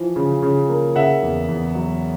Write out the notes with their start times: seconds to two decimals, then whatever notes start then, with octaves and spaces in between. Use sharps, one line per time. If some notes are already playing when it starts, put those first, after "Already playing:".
Already playing: E3 F3
0.16 C#3
0.43 C#3
0.69 A#3
0.96 C#3 E5 F#5
1.22 E2
1.48 E2
1.75 F#3